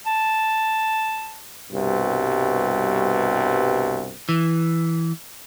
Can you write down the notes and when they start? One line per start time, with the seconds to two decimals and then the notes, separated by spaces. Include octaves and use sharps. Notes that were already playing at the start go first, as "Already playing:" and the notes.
0.06 A5
1.72 C2 G2 B2
4.29 E3